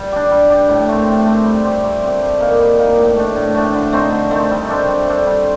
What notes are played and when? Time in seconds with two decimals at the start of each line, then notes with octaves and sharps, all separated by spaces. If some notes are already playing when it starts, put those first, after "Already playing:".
Already playing: G3
0.12 D4 G4
0.31 G3
0.50 D4 G4
0.69 A2
0.89 A3 C4
1.07 A2
1.26 A3 C4
1.45 G3
1.64 C4 G4
1.84 G3
2.03 C4 G4
2.22 G3
2.40 A#3 D#4
2.60 G3
2.79 A#3 D#4
2.98 A2
3.16 A3 D4
3.36 A2
3.55 A3 D4
3.74 D3
3.93 A3 C4 D#4
4.12 D3
4.31 A3 C4 D#4
4.50 G3
4.69 D4 A4 C5
4.88 G3
5.07 D4 A4 C5
5.26 G3